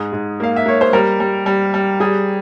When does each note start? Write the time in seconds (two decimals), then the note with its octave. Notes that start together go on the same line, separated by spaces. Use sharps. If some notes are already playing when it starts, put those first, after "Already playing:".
Already playing: G#2 G#4
0.13 G#2
0.40 A#3 F5
0.56 E5
0.66 A#3 C#5
0.81 C5
0.93 G3 A#4
1.20 G3
1.46 G3
1.74 G3
2.00 G3 G#4